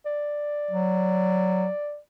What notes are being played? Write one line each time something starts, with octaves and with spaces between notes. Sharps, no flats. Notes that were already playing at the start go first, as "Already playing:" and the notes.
D5
F#3